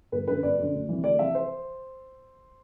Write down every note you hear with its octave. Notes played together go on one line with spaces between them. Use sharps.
G1 B4
F#2 D3 B4
G1 D5
F#2 D3
D2
C3 E3
D2 D5
C3 E3 E5
C5